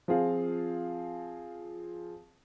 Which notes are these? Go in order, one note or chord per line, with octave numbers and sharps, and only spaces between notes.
F3 C4 F4 G#4 F5